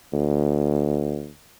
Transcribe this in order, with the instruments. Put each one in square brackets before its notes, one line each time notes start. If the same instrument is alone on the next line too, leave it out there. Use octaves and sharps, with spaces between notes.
[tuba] D2